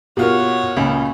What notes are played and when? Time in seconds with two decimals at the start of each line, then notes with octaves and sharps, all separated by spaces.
0.17 B2 F4 G4 A#4 C#5 F#5
0.76 C#2 A#2 C#3